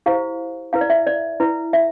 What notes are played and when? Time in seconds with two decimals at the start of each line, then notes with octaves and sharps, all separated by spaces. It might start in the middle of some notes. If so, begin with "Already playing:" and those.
0.06 E4 G4 C5 F5
0.73 E4 B4 F5
0.81 D5
0.90 E5
1.07 D5
1.40 E4 B4
1.73 E5